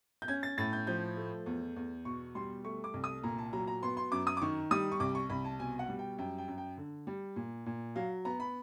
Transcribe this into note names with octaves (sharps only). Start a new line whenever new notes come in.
G6
C#4 G#6
A6
A2 A6
G6
F3 G6
A3
E2
E2
B2 C#6
G3 C6
A3 C#6
D6
C2
D#6
A#2 A#5
A5
F#3 A#5
A#5
B3 C6
C6
F#2 D6
D#6
D6
D#3 C#6
G3 D#6
C#6
C2 D6
C#6
C2 B5
A5
B2 G#5
F#5
G3
G5
F#2 G5
G5
F#2
G5
D3
G3
A#2
A#2
F#3 F5
B3 A#5
B5